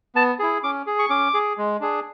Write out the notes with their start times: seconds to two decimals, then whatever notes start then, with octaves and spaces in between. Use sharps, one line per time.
0.15 B3 A5
0.39 E4 G#4
0.63 C#4 D6
0.87 G#4
0.99 C#6
1.10 C#4 D6
1.34 G#4
1.58 G#3
1.81 D4 G#4